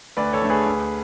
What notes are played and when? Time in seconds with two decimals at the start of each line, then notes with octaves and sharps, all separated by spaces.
0.17 D2 B4 D5
0.33 A4 C#5
0.42 D3 A3
0.50 G#4 B4
0.66 D2